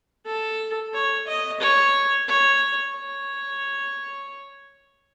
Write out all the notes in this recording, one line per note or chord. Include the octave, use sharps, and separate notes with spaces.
A4
C#5
D#5
C#5
C#5
C#5